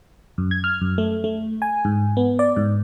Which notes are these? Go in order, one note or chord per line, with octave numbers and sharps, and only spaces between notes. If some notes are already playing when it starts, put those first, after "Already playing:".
F#2
G#6
F6
F#2
A3
A3
G#5
G#2
B3
D5
G#2